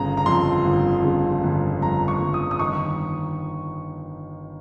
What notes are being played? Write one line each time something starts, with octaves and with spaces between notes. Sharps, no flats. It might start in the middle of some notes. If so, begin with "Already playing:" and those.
Already playing: G1 C#3 A#5
A#5
F2 C6
G1
C#3
G1
F2 A#5
C#6
G1
D#6
D#6
D#3 C#6